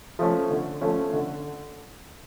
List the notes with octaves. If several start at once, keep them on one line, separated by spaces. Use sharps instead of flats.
F3 A3 C#4
D3
F3 A3 C#4
D3